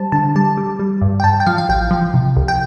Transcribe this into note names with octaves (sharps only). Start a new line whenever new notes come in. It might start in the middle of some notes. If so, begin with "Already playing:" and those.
Already playing: G3 C5 A5
D3 A5
G3 A5
G3
G3
G2
G5
G2 A5
G5
F3 F5
F5
A1 G5
F3
C3
C2
G5